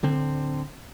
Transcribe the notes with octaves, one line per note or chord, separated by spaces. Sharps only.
D1 D3 C4